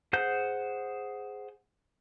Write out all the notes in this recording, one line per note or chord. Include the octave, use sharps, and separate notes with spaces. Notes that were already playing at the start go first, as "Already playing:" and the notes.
G#4 C5 F#5 G6